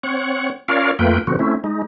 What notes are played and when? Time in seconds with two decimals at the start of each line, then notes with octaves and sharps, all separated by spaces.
0.03 C4 C#5 F#5
0.68 C#4 F4 A#4 C#5 D5 F5
0.99 F2 A3 A#3 F4 B4 G5
1.27 B2 D3 F3 B3 C4 F#4
1.39 A3 C4 C#4 E4
1.64 G#3 D#4